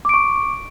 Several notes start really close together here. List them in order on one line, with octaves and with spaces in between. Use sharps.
D6 D7 C#6